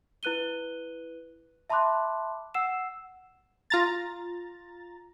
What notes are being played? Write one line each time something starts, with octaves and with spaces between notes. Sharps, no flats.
E4 B4 F#6 D#7 G7
E5 A5 B5 C6 D6 F#6
F#5 E6 C7 E7
F4 A#5 A6